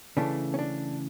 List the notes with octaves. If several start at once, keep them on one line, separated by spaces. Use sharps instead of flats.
C#3 E3 A3 D4
C#4
D4